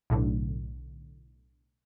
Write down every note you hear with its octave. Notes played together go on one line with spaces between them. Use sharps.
B1 A2 D3